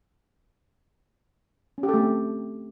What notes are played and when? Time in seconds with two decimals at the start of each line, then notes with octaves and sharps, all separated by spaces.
1.78 C#4
1.83 G4
1.89 A4
1.94 A3
1.99 C4